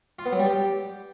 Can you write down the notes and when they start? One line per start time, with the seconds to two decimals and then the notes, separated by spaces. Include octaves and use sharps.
0.19 F4
0.25 B3
0.32 F#3
0.39 G3
0.46 G4